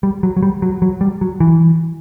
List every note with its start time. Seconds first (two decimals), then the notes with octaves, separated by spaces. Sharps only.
0.03 G3
0.23 F#3
0.37 F#3
0.43 G3
0.62 F#3
0.82 F#3
1.01 G3
1.21 F#3
1.40 E3